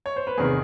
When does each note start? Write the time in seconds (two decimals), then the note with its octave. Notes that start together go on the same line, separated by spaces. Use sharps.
0.06 C#5
0.16 C5
0.27 B4
0.38 E2 C3 D#3 G#4 A#4